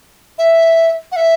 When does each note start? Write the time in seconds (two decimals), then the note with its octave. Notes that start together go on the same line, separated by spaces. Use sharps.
0.38 E5
1.12 F#5
1.16 E5